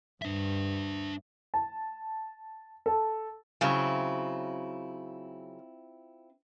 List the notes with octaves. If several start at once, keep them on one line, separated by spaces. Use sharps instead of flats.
G2 D4 E5
A5
A4
C#3 F#3 C4 E4 F4